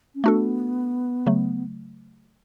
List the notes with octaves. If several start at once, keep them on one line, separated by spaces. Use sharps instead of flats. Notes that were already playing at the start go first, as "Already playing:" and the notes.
C#4
A3 B3 D4 F#4 A4
C#3 F#3 A3